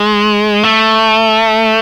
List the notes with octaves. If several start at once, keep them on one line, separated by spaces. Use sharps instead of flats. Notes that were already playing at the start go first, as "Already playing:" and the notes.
Already playing: G#3
A3